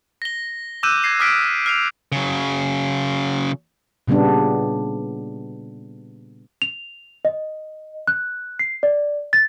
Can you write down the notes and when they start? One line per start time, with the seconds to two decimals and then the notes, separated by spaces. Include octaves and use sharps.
0.22 A#6 G7
0.83 D6 E6 F#6 G6 D#7 E7
1.03 G#6 A#6 C7 E7
1.20 D6 D#6 F6 B6 D7
1.66 F6 C7 F7
2.12 C#3 F#3
4.08 A#2 C#3 G3 B3 D4
6.62 F7
7.25 D#5
8.07 F#6
8.59 C7
8.83 D5
9.33 A6